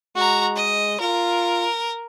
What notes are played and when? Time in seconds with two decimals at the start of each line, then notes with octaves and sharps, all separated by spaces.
0.16 G#3 F#4 A#5
0.56 D#5
1.00 F4 A#4